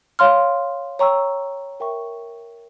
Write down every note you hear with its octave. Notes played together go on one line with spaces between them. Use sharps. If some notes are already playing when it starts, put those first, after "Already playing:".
C#5 F5 C6 F6
C#5 G5 A#5 C#6 E6
A#4 E5 G5 C#6